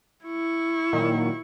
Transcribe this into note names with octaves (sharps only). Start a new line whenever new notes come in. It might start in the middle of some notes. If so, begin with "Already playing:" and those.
E4 C#6
A#2 D#3 F#3